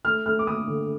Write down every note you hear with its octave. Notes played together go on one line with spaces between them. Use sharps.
A3 F6
A3 F6
D6
A3 D#6
D3